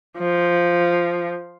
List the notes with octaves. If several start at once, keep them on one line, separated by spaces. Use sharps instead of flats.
F3